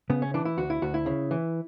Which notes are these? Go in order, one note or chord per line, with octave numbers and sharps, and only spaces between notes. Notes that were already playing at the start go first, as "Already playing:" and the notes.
C#3 B3
C#4
E3 D4
E4
D2 F#4
E4
D2 F#4
E4
C#3
E3